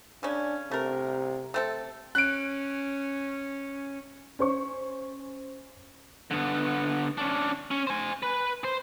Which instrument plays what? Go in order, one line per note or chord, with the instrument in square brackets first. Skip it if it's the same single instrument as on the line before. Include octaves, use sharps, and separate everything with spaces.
[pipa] C#3 C#4 [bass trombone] D4
[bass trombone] C3 [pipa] A3 A#4
[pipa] A3 C4 A4
[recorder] C#4 [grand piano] F#6 D7
[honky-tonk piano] C#4 C5 C#6
[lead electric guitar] D3 B3
C#4 D4
C#4
C5 G#5
B4
C5